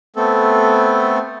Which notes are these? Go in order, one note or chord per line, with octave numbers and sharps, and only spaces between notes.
A3 B3 C4 A4